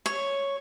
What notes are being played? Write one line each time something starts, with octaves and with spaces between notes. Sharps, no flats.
C#5